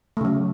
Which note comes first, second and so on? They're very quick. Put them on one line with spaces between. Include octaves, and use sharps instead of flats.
A3 C#3 F#3